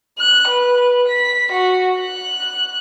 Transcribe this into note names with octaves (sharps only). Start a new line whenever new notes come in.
F#6
B4
B6
F#4
F#6